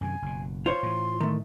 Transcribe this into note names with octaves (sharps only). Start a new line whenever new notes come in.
F#2 C3 D#3 G#5
F#1 B2
F4 C5 C#5 C6
A2 E3
D#3 A3